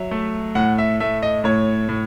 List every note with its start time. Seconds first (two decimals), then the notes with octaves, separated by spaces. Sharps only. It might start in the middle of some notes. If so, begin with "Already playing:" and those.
Already playing: F#3 E5
0.11 A3
0.55 A2 F#5
0.78 E5
1.00 A3 E5
1.23 D#5
1.44 A2 C#5
1.89 A2